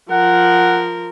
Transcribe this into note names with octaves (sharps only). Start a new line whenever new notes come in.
F3 A#4 F#5